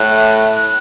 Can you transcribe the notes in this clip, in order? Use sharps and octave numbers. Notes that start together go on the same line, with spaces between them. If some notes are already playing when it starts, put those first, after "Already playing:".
Already playing: A2 F#6
F#6